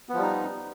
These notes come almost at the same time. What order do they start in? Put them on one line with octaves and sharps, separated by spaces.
B3 F3 G3 D#4